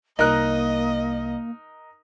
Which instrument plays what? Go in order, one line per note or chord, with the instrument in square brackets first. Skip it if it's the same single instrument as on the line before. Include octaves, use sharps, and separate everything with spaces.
[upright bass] C2 [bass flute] A#3 [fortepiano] D#4 A#4 F#6 [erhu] D#5